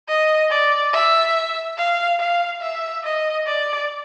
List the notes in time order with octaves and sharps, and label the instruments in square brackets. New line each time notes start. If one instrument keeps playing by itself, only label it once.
[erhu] D#5
D5
E5
F5
F5
E5
D#5
D5